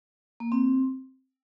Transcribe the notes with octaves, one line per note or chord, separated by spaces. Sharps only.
A#3
C4